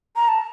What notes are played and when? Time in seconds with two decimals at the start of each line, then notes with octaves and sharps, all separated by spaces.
0.16 A#5
0.28 A5